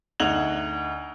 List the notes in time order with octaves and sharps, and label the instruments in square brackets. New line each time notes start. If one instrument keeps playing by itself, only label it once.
[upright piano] D2 D#4 F#5 G#6 F7 F#7